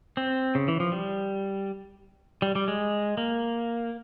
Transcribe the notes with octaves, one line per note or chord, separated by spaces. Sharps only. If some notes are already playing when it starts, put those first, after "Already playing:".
C4
C#3
E3
F3
G3
G3
G3
G#3
A#3